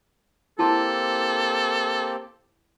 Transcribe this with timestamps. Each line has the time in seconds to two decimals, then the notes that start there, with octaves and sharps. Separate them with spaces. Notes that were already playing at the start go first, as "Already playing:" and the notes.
0.59 A#3 C4 E4 G4 A4 A5 C6